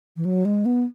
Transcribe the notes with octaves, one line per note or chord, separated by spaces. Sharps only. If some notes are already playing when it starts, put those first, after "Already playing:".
E3
F#3
G#3
B3